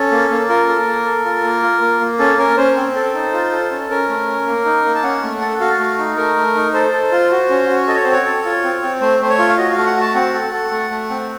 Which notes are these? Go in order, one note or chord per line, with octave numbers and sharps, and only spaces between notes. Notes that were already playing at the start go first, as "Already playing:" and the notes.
Already playing: C#4 A4
A#3
A#3
F4 A#4
A4
A#3
A4
F4
A#3
F4
A#3
A#3
C#4 A4
C#4 A#4
C#4 C5
C4
A4
D#4
F4
A4
C#4
C#4 A#4
A3
C#4
A#3
D#4
A#3
A5
C#4 F#5
A3
A4
F#4 F5
A3
D#4
A3 A#4
A3
D#4
A4 C5
A4
F4
F#4
C#4
F#4
A4 D#5
C#5
C4 C5
C#5
A4
F4
C4
C4
A3 C5
A3 C5
C#5
F4
F5
F#4 D#5
F5
A3
F#5
F#4 A5
C4 F#5
A4
A4
A3
A3
C4